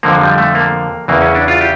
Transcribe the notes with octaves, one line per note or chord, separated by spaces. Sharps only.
F2 D3 F3 A#3
G3
A3
A#3
E2 C#3 E3 A#3
C#4
D4
F4
G4